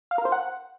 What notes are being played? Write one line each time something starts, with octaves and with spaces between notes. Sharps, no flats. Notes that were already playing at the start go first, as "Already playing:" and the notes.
F5
A#4
C5
F#5